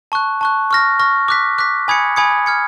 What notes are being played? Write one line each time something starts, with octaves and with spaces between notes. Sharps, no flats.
A5 C#6 F#6
A5 C#6 F#6
C#6 F6 A#6
C#6 F6 A#6
D6 F#6 B6
D6 F#6 B6
G#5 B5 D#6 G#6 C#7
G#5 B5 D#6 G#6 C#7
F6 G#6 C#7